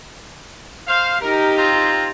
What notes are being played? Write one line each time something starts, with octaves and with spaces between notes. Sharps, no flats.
C5 F5
D#4 G4 A#4
C4 F4 A#5